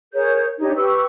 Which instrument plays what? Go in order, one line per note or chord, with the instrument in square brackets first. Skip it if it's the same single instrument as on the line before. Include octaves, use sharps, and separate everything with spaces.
[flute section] G#4 A#4 C#5 G6
D4 D#4 G4 C#5
G4 B4 C#6 E6